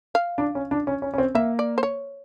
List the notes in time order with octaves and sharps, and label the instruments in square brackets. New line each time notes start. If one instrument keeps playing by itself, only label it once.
[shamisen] F5
[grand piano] D4
C#4
D4
C#4
C#4
C#4
C4
[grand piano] A#3 [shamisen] E5
[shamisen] D5
C5
C#5